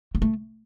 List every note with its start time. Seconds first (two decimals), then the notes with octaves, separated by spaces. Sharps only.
0.15 A#3
0.22 A3